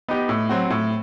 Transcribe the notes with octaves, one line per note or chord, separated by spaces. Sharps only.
B3 D#4 G4 D#5
A2
F#3 C4 F#4
A2